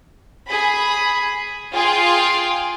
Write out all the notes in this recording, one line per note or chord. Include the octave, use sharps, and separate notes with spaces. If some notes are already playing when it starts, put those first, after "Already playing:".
G#4 B5
F4 G#4 F5 G5 C6